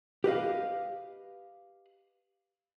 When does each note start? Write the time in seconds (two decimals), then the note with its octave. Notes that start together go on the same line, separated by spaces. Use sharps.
0.24 G4 B4 D#5 F5